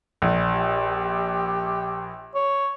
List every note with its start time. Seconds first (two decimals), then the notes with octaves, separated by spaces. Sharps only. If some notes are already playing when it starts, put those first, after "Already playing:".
0.22 A#1
0.55 G4
2.35 C#5